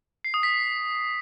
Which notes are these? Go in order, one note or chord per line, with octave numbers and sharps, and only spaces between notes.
C7
D#6
B6